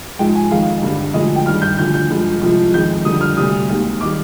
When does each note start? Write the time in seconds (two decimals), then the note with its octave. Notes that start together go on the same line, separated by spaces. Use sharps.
0.19 G#2 F3 G#3 G5
0.35 G#5
0.51 F2 D#3 G#3 F5
0.83 G2 D3 G3
1.14 D2 D3 F3 G#3 D#5
1.36 G5
1.46 G2 D#3 G3 F6
1.62 G6
1.78 D2 D3 F3 G6
1.94 G6
2.10 G2 F3 G#3
2.41 C2 C3 F3 G#3
2.73 F2 D#3 G#3 G6
3.05 F2 D3 G3 D#6
3.21 F6
3.37 D2 C3 G3 D#6
3.70 D#2 D#3 G#3
4.01 D#3 G3 D6